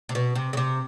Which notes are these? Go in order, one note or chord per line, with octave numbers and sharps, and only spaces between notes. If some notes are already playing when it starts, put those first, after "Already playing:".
C3
B2
C3
C#3
C3